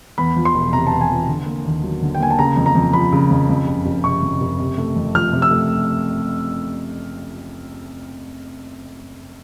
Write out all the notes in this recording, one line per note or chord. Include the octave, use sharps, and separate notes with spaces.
E2 B5
F3
C6
E1
C3 A#5
A5
E2
G#5
F3
D3
A#3
D#2
F#3
D3
G5
A#3 G#5
A5
C#3 A#5
F2
A#5
F2
F3 B5
C#3
F2
F2
F#1
F#1
C3 C#6
F2
F#1
C3
A3
F2
F3 F6
C3
E6
A3